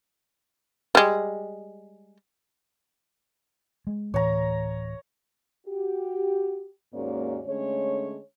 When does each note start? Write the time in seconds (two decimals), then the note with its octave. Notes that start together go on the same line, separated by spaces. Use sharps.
0.95 G3 G#3
3.87 G#3
4.14 D1 A2 E3 C#5 A#5
5.67 F#4 G4
6.93 D#2 G#2 A#3 C#4 F#4 D5
7.46 D3 G#3 A3 C#4 C#5